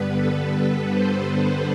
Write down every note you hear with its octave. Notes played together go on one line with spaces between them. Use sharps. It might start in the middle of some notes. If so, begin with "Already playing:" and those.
Already playing: G2 D3 G3 B3 B4
A4
B4
C5
C5